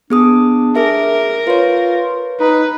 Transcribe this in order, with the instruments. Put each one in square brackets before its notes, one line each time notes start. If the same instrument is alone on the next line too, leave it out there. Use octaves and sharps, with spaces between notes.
[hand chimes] B3 G#4 D#6 [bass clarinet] D4
[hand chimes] G#4 E5 [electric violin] A#4
[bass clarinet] F4 [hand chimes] B4 C#5
[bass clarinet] D#4 [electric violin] B4